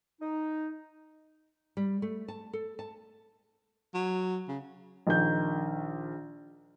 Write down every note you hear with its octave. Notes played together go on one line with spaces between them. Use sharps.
D#4
G3
A3
A5
A4
A5
F#3
C#3
A#1 D#3 G6